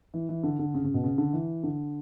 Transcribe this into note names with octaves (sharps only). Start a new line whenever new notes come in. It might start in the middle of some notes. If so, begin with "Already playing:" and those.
E3
E3
D3
D3
C#3
C#3
B2
C#3
D3
E3
D3